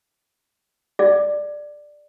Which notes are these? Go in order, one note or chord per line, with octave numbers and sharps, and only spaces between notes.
G#4 D5